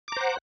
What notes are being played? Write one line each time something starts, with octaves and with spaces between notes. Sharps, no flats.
C5 F#5 A#5 D6